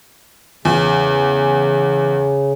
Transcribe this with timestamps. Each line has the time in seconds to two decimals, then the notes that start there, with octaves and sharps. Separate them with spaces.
0.65 E2 C#3